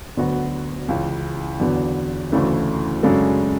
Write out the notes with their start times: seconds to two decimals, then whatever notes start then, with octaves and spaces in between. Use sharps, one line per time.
0.17 D2 D3 F#3 B3 F#4
0.88 C#2 C#3 E3
1.60 E2 D3 F#3 B3
2.32 D2 C#3 E3 A3 D4
3.03 F#2 C#3 G#3 D4 A4